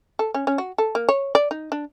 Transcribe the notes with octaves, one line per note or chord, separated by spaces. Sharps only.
A4
C#4
C#4
F#4
A4
A#3
C#5
D5
D#4
D4